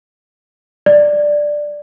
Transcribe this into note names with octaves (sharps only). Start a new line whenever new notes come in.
D5